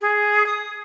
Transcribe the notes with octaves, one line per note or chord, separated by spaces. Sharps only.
G#4
D#6